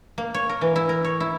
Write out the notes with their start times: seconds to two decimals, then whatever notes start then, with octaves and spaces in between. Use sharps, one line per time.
0.18 A#3
0.34 C#5
0.49 A#4
0.61 E3
0.76 E4
0.89 A#4
1.04 C#5
1.20 E4